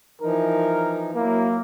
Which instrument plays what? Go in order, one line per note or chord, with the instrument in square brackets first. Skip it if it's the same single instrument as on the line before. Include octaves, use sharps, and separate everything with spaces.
[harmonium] E3 F3 D#4 [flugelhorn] A#4
[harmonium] F#3 E4 [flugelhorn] A#3